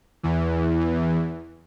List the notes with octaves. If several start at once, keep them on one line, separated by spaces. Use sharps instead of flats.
E2 E3